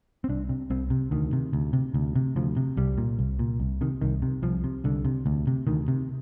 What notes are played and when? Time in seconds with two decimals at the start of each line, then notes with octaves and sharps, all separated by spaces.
0.24 C4
0.29 C2 D4
0.49 C3
0.70 C2 C4
0.90 C3
1.11 D2 D#3
1.33 C3
1.53 D2
1.73 C3
1.94 D2
2.16 C3
2.36 D2 F3
2.57 C3
2.77 C2 G3
2.98 A#2
3.19 C2
3.39 A#2
3.60 C2
3.81 C3 D#3
4.01 C2 D#3
4.22 C3
4.42 C2 F3
4.64 C3
4.84 C2 D3
5.05 C3
5.26 D2
5.47 C3
5.67 D2 D#3
5.88 C3